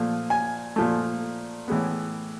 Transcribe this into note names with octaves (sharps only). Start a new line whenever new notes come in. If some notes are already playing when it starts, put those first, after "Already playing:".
Already playing: A#2 F3 A3
G#5
A#2 F3 A3
A2 E3 G#3 B3